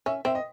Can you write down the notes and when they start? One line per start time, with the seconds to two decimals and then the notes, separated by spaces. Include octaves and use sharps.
0.06 C#4 E5
0.25 C4 E5
0.35 D#5